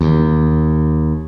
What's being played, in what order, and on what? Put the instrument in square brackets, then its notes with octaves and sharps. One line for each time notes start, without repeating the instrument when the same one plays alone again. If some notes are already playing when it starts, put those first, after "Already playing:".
[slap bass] D#2